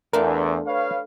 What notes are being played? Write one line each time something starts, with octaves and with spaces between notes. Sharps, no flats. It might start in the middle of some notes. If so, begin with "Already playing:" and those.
E2 A3 D4 F4 A#4
B4 C#5 F5